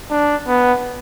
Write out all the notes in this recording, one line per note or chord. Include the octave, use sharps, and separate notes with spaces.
D4
B3